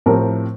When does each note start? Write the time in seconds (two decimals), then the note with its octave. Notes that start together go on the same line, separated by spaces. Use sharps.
0.06 A2 F3 C4 G4 A#4